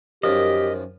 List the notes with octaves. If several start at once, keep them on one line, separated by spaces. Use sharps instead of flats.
F#2 D#3 F3 G4 D#5